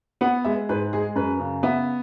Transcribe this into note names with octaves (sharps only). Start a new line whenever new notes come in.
B3 F#5
G#3 E5
G#2 B4
G#3 G#4
F#2 B4
C#3
B3 E5